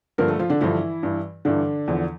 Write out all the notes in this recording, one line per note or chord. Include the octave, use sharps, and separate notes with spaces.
G2 D3 F3 A#3 A#4
A3 A4
F3 F4
D3 D4
G2 D3 E3 F3 E4
G2 E3
G2 D3 E3 D4
E2 D3 F3